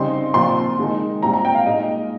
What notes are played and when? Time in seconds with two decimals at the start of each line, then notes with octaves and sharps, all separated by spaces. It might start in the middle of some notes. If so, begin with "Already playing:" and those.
Already playing: C#3 G3 C4 D#4 C6
0.33 A#2 F3 C4 F4 C6
0.78 D#3 G#3 D#4
1.22 A#2 G3 C4 F4 A#5
1.34 A#5
1.45 G5
1.55 F5
1.66 A#2 G#3 D#4 D#5